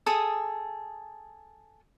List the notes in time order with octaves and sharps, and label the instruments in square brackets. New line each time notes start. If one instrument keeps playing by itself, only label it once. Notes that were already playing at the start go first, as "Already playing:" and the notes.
[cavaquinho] G#4 A4 D#6